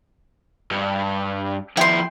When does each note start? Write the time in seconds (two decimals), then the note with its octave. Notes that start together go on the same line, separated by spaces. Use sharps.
0.71 G2
1.77 F2 E4 G5 C6